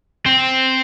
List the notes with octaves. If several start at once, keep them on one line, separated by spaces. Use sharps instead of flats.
C4